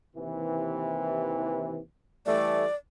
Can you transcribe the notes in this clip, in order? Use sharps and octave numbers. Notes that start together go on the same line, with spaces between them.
D#2 C3 E3
E3 G3 A3 D5